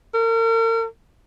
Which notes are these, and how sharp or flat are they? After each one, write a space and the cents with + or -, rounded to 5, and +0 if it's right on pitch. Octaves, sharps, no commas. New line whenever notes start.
A#4 -40